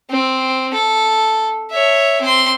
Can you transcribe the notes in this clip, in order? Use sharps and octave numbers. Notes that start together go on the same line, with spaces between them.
C4
A4
C#5 E5
C4 C6